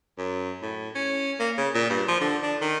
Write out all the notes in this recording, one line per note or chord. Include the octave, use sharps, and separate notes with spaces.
F#2
A2
C#4
A#3
C#3
A#2
G2
F3
D3
D4
D#3